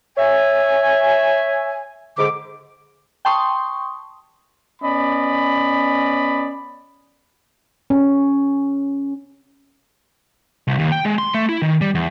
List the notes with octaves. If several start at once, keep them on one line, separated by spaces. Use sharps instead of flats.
C#5 E5 G#5
G#2 D3 D6
G5 A5 C6 C#6 D#6
B3 C#4 D5 D#5 B5
C#4
C2
D#2
G5
G#3
C6
A3
E4
D#3
G3
E2